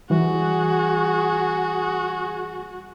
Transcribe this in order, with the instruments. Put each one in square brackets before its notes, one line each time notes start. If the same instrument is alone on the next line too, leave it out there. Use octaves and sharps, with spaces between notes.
[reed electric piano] E3 G3 [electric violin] F#4 [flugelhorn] G#4